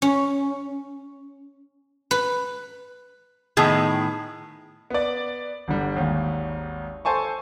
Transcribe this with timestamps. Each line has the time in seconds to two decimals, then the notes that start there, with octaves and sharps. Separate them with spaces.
0.02 C#4
2.11 B4
3.57 A2 D#3 B3 G#4
4.90 B3 D5
5.68 G1 D3 G3
5.97 G#1 D#2
7.05 A4 C5 G#5 A5 C#6